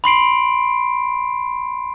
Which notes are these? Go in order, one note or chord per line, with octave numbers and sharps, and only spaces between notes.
B5 C6 C7 D7